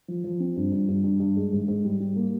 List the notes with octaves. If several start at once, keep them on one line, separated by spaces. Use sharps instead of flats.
F3
F3
C4
G2
G2
G2
G2
G2
G#3
G#2
G#2
G3
G3
A#3